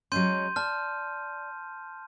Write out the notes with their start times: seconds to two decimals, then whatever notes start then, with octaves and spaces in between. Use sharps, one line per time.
0.12 F#3 G#3 C#4 C6 G6 D#7
0.56 D5 A5 F6